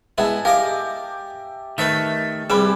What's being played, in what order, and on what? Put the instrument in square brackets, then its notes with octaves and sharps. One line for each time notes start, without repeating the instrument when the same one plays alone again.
[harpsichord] G#3 B3 E4 [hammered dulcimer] E5 G#5 A5
[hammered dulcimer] G4 [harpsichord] A#4 D#5 D6 [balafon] F5
[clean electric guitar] D#3 A3 [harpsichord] B4 C#5 E5
[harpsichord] C2 B4 D6 [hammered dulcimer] G3 G#5 [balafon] G#4 B5